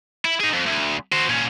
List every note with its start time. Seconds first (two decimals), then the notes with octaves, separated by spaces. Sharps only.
0.25 E4
0.40 D#4 G#4
0.53 F2
0.66 D2
1.12 F#4 C5
1.29 A#2 C#4